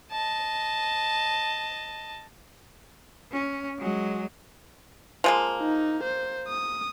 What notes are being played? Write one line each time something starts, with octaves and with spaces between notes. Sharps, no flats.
D#5 A5
C#4
F#3 G#3
F3 G#3 A#3
D#4
C5
D#6